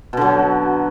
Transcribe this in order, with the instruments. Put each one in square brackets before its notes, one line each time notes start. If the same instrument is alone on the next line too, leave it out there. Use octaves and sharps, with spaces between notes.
[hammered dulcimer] B2
D3
F#3